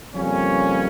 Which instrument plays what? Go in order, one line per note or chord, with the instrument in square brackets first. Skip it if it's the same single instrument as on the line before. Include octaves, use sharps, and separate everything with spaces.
[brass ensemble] F2 C#3 G3 A#3 C#4